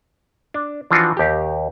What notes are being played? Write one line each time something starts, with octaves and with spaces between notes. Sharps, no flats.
D4
E3 F3 D4 F4 F#4
D#2 G4